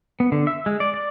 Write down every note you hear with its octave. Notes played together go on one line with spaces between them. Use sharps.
B3
D3
E5
G#3
D5
D5